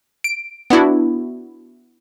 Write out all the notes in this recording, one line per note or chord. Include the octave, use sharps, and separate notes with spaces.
D7
B3 D4 E4 F#4